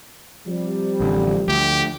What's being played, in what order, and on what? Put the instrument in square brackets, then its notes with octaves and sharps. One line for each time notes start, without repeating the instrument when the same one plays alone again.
[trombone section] C3 G3 [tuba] F3
[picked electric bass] A1 D3
[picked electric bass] D2 [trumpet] G4